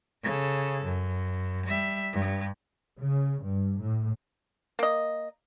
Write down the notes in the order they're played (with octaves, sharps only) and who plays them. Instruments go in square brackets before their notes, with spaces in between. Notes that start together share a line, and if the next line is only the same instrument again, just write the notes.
[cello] C#3 A4
F#2
G3 E5
G2
[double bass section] C#3
G2
A2
[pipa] A#3 D#5